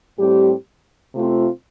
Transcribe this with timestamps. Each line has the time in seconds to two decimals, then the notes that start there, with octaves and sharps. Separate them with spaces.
0.19 A2 G3 C4 G4
1.15 C3 A3 C4 F4